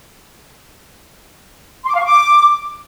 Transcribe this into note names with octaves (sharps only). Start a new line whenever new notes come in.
C6
D6
F5
C#6
D6